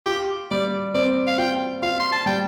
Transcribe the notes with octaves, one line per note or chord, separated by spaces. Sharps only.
F4 G4
G3 D5
C4 D5
F5
F4 G5
F4 F5
C6
A5
G3 G5